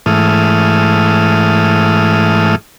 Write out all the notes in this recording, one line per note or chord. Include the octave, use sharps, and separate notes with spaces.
G#2 E3 A3 D#6 F6